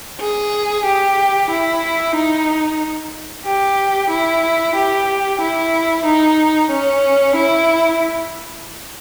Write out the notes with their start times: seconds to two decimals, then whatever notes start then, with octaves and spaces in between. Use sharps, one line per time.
0.20 G#4
0.86 G4
1.50 E4
2.15 D#4
3.46 G4
4.10 E4
4.75 G4
5.41 E4
6.05 D#4
6.70 C#4
7.36 E4